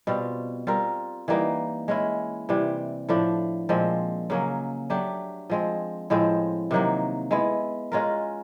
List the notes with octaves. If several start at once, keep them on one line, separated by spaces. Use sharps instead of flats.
B2 G3 C4 F4
G3 C4 F4 A#4
E3 G3 A#3 D#4
G#3 C#4 E4
C3 E3 G3
A2 F3 A3 D4
A#2 F3 G#3 C4
C#3 F#3 A#3 C#4
F#3 A3 D4 G4
F3 G#3 C4
A2 F3 G#3 C4
C3 D#3 F#3 A#3
G#3 B3 E4
G#3 C#4 F4 A#4